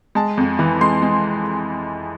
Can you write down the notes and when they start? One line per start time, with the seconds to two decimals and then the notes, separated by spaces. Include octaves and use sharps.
0.15 G#3 A5
0.37 F2
0.59 E3
0.81 G#3 C6
1.02 G#3